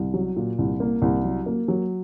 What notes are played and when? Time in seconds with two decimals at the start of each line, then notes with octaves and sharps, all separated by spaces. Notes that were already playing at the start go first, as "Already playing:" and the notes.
Already playing: C2
0.14 F#3
0.36 A#2
0.59 C2
0.80 A#3
1.02 C2
1.24 F#3
1.46 A#3
1.68 F#3